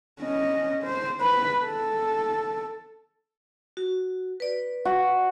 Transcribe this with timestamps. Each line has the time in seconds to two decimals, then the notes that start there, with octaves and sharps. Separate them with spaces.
0.21 C#4 D#5
0.84 C5
1.21 B4 B5
1.65 A4
3.77 F#4
4.40 B4 D5
4.85 F#4